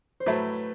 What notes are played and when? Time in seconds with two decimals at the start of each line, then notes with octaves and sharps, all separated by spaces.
0.20 C5
0.26 A2 F#3 A3 B4